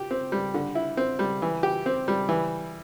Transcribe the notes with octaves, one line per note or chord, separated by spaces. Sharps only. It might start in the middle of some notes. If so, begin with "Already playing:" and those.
Already playing: G4
C4
G3
D3
E4
C4
G3
E3
G4
C4
G3
E3